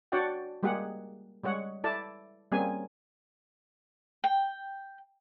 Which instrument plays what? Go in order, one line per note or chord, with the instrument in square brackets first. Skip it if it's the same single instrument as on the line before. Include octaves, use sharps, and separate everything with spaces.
[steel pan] D4 F#4 C#5 D5 F#5 G5
G3 G#3 A#3 G4 G#4 F#5
G3 G#3 C#5 F#5
E4 A4 D5 A5
G3 A#3 C4 C#4 G#4 G#5
[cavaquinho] G5